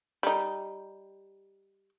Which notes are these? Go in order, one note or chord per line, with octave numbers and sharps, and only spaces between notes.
G3 D#4